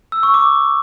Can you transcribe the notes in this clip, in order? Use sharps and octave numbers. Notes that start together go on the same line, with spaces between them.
E6
C#6
D6